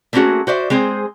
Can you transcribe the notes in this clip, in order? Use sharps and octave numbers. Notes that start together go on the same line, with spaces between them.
A3 A#3 C4 C#4 F#4 G#4
F#4 C5 D5 E5
G#3 C4 G#4 C5